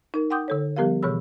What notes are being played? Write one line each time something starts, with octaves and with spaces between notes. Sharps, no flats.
D#4 A#4
F#5 G5 C6 D6 D#6 G6
D3 A4 C#5
F3 G3 B3 G4 A#4 F5
B2 E3 G#4 C#5 B5 E6